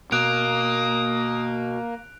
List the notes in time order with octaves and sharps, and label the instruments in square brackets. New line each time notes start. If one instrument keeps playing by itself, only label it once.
[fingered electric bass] B2 [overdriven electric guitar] A#3 [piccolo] D#6 [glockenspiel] F#6 D7 F7